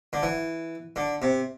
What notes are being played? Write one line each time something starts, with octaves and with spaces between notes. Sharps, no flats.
D3
E3
D3
C3